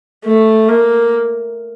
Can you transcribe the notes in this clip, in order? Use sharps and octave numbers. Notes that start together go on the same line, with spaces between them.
A3
A#3